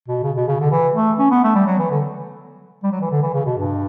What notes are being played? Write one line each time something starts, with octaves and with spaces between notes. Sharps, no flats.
B2
C#3
B2
C#3
D3
E3
A3
C#4
B3
A3
G3
F#3
E3
D3
G3
F#3
E3
D3
E3
C#3
B2
G2